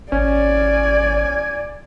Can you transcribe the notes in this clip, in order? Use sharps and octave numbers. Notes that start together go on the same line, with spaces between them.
G#1 C#4 D5 G#5